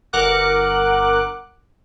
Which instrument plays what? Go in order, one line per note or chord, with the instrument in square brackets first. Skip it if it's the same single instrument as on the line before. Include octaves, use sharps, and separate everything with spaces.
[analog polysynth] G1 A#4 F#5 D6 F#6